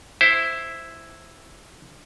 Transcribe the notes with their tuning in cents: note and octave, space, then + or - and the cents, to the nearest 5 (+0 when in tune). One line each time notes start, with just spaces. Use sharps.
E4 +0 C5 +0